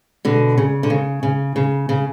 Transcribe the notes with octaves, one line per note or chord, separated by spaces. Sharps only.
B2 D3
C#3
D3
C#3
C#3
C#3
C#3